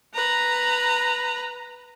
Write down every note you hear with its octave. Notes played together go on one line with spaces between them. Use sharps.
B4 A#5